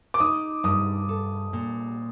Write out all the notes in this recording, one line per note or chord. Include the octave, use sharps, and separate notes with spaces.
D6
D#4 D#6
G2 D#6
A4
A#2